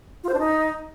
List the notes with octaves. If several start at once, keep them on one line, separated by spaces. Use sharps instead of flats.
F4
C5
D4
D#4